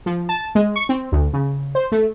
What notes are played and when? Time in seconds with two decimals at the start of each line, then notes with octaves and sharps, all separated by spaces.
0.06 F3
0.29 A5
0.55 G#3
0.76 C#6
0.89 C4
1.12 D2
1.33 C#3
1.75 C5
1.92 A3